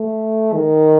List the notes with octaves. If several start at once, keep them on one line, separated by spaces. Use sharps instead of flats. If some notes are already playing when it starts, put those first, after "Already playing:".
Already playing: A3
D#3